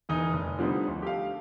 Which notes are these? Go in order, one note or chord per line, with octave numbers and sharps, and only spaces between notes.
E1 E3 D#4 D#6
F1
D3 F3 G3 B3 D#4
D2
G4 A4 F5